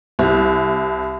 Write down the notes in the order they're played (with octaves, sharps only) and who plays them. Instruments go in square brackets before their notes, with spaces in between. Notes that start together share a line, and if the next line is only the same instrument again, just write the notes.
[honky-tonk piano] C2